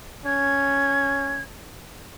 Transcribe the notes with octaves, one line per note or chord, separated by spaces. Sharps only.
C#4 G#6